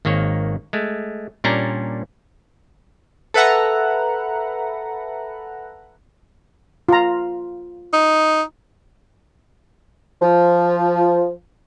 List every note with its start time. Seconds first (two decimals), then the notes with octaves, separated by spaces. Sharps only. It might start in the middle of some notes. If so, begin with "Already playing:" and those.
0.05 G#1 D#3 A#3 C#5
0.73 G#3 A3
1.44 A#2 G3 C#4 D4 A#5
3.34 A4 B4 E5 F#5 A#5
6.89 F4 A#5
7.93 D#4
10.22 F3